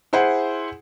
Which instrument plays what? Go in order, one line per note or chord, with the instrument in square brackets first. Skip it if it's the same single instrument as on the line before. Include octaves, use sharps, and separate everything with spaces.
[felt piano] E4 G#4 C5 F#5